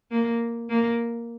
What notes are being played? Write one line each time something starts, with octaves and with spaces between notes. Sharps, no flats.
A#3
A#3